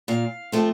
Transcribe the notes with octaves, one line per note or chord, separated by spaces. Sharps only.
A#2 F5
F3 A3 C4